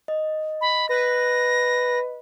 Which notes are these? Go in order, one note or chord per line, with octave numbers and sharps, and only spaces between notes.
D#5
B5
B4 A#6